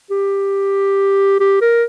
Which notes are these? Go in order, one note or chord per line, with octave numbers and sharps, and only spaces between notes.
G4
G4
A#4